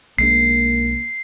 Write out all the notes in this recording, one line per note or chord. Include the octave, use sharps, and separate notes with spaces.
B1 G#3 A#3 D4 C7